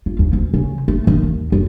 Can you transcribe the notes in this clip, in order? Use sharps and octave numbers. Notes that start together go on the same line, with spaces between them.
F4
D#2
D2
C#3
A3
D#3
D#2
F#2